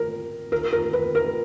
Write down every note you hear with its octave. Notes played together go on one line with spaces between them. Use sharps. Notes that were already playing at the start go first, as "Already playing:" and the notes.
Already playing: A#4
A#4
A#4
B4
A#4